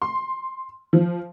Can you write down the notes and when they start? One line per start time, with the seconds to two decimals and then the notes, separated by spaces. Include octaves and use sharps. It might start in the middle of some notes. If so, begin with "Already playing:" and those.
0.02 C6
0.93 F3